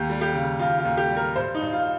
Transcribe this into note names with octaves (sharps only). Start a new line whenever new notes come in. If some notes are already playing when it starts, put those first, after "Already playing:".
Already playing: D#2 G4
G3
G4
C#3
D#2 F4
F4
D#2
G4
G3
A#4
G2 C5
D#4
G2
F4